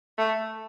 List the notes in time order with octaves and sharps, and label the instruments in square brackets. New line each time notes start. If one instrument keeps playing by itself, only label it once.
[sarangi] A3